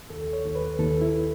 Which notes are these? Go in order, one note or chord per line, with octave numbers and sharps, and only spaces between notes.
D#2 A4
C#5
D#2
B4
D#2 A4
E4